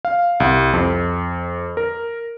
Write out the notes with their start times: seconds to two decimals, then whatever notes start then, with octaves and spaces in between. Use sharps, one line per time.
0.05 F5
0.40 C2
0.73 F2
1.77 A#4